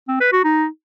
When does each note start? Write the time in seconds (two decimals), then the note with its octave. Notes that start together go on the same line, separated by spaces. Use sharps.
0.09 C4
0.21 B4
0.32 F#4
0.44 D#4